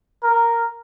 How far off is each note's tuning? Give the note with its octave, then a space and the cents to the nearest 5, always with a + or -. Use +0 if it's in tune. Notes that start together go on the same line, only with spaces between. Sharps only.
A#4 -5